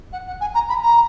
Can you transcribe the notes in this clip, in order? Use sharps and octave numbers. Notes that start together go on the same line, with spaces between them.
F#5
F#5
G#5
A#5
B5
A#5